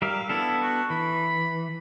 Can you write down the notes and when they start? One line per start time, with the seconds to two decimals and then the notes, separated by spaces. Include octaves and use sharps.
0.02 G3 A#4 E5 F5
0.29 B3 D4 E4 A4
0.62 F#4
0.90 E3 B5